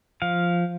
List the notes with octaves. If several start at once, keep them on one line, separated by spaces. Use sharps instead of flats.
F3 F5